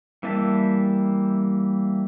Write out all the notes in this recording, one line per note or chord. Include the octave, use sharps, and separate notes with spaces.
E3 G3 A#3 E5 A5